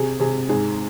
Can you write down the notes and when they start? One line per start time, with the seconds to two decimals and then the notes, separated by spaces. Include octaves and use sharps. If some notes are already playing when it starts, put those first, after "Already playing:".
Already playing: C3 G#4
0.20 C3 G#4
0.49 G#2 G#4